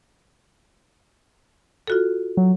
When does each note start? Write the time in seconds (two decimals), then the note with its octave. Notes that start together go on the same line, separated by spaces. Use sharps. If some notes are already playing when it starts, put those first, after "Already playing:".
1.87 F4 F#4 A4
2.37 F#3